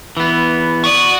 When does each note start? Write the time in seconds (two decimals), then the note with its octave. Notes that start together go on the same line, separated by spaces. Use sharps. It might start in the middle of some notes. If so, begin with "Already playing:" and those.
0.17 E3 B3
0.84 F#4 D5 D#6